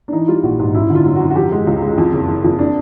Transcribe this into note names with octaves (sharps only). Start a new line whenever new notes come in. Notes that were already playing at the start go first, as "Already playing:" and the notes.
D4
E3 D#4
G3 F4
A#1 F#4
G#2
F#2 E4
D3
F4
F#3
F#2 F#4
F#4
F3 G4
G#3
C#2
G#3
F2
F#1
F#1
F2
D4